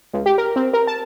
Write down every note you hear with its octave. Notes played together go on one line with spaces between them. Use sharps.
C#2
G4
A#4
C4
A#4
A5